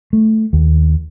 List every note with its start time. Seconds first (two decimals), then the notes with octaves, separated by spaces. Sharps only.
0.13 A3
0.53 D#2